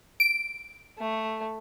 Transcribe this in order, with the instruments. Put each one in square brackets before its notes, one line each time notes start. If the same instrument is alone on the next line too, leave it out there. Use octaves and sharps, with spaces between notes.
[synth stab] D7
[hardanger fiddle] A3